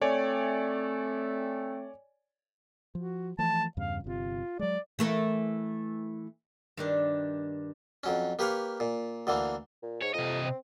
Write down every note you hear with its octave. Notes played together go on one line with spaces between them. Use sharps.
A3 C4 C#5 D5 G#5
F3 F#4
E3 F3 A3 A5
E2 G2 C#3 F5
G1 C3 F4
F#3 G#3 D5
E3 A3 A#4
G2 D#3 D4
F2 F#3 C#4
A#3 G4 B4 C#5 F5
A#2
D2 D3 E3 A#3
A#2
G#2 C#5
F2 C3 D#5
C4